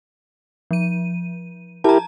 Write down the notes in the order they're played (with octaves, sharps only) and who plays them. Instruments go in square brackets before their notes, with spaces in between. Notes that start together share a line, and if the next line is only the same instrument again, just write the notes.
[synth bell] F3 D#7
[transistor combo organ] E4 G4 A#4 [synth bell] A5 A#5